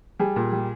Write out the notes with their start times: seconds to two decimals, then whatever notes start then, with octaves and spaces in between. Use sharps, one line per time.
0.19 G3 G#4
0.36 A#2
0.52 G3